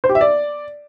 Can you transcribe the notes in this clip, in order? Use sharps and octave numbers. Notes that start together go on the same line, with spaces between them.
C5
G4
E5
D5